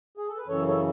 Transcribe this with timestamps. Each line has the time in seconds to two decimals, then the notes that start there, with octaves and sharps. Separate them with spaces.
0.17 G#4
0.28 A4
0.38 B4
0.47 F#2 C#3 E3 A4 C#5
0.68 A4 C#5